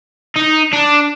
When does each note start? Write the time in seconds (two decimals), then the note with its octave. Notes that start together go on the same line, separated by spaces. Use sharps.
0.36 D#4
0.73 D4